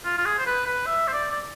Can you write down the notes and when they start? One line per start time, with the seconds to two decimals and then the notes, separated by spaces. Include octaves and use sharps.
0.05 F4
0.17 F4
0.25 G#4
0.38 C5
0.46 B4
0.66 B4
0.86 E5
1.07 C5
1.13 D5
1.32 D5